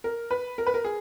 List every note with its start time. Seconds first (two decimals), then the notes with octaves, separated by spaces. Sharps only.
0.04 A#4
0.31 B4
0.58 A#4
0.67 B4
0.74 A#4
0.85 G#4